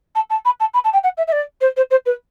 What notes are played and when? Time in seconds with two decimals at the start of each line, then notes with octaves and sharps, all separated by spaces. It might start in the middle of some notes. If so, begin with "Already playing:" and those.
0.15 A5
0.30 A5
0.45 B5
0.60 A5
0.73 B5
0.84 A5
0.93 G5
1.03 F#5
1.17 E5
1.27 E5
1.32 D5
1.60 C5
1.76 C5
1.90 C5
2.05 B4